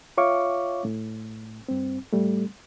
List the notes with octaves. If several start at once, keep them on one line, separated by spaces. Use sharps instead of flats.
F4 C#5 E5 F5 C#6 D6
A2
G2 C4
A2 G3 A3